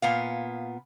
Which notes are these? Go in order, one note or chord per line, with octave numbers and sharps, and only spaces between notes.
A#2 B3 F5